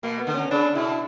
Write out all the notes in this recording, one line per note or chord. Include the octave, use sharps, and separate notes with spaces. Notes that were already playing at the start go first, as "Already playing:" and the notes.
B2 A#3
B3
D3
C#4
C#3 D4
B2 E4